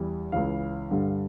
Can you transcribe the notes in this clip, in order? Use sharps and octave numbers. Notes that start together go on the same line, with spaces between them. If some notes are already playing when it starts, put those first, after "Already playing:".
Already playing: E2 E3 G3
C#2 C#3 E3 F5
G2 D3 G3